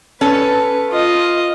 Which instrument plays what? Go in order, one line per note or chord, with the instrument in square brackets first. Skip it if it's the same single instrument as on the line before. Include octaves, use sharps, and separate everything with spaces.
[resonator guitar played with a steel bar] C#4 A4 [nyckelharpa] B4
[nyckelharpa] F4 D#5